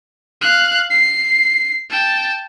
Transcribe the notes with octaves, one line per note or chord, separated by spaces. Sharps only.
F5 F#6
C7
G5 A5